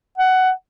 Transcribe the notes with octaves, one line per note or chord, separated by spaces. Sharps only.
F#5